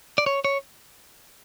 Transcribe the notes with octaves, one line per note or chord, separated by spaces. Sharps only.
D5
C#5
C#5